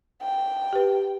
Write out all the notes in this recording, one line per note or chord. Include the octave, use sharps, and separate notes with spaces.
G5
G4 B4